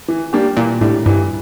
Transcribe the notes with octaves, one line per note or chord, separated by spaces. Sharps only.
E3
G3 A#3 D4 G4
A#2 E3
A2 G3 D4
G2 E3